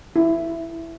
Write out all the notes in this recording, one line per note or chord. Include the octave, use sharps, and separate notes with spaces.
E4